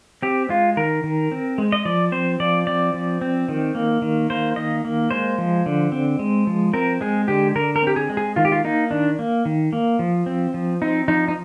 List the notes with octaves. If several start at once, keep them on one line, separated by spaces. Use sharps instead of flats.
C4 G4
G#3 F4
D#3 A#4
D#3
C4
G#3
D#5
F3 D5
C4 C5
F3 D5
C4 D5
F3
C4
D#3
A#3
D#3
A#3 C5
D#3 D#5
A#3
G#3 C5
F3
D3
C4
G#3
F3
C4 A#4
G#3 G#4
D3 G4
D3 A#4
A#4
C4 G4
G#4
G#3
G#4
D#3 F4
G4
F4
A#3 D#4
D#3 D4
A#3
D#3
A#3
F3
C4
F3
C4 D#4
F3 D#4
D#4